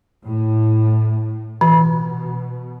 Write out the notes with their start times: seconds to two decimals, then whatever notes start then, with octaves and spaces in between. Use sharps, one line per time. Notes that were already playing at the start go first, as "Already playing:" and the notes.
0.25 A2
1.61 B2 E3